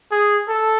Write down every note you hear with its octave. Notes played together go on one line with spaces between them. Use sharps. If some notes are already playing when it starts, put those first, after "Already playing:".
G#4
A4